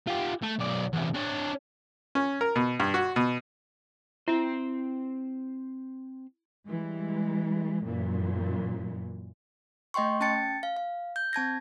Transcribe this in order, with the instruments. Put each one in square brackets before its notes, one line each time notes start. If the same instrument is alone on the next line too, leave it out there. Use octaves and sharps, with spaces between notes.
[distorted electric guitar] F4 G4
A3
B1 D5
E2 C3
D4 C#5
[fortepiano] C#4
A#4
B2
G2
F#4
B2
[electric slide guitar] C4 C5 [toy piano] E4 E5
[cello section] E3 G3 G#3
F#2 A#2 E3
[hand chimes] A3 D#5 G5 C6 C#6
C#4 G5 A5 A6 C#7
F5
F5
G6
C4 A5 G#6 A#6